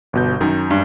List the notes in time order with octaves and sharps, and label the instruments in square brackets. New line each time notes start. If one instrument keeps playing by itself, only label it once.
[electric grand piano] G1 B2 G6
[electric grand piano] F#2 [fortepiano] D#3
[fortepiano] G2